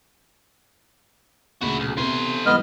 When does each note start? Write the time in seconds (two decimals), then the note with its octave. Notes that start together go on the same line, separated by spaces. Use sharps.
1.62 D2 A#2 C#3 E4 F#4
1.80 B1
1.98 C3 A3 B3 C5
2.46 G#2 E3 G3 B3 D#5 F6